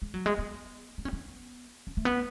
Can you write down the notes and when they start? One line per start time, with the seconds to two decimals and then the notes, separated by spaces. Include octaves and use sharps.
0.02 G#3
0.14 F#3
0.26 G#3
0.39 B3
0.98 D4
1.05 C#4
1.13 B3
1.87 C#4
1.97 A3
2.05 B3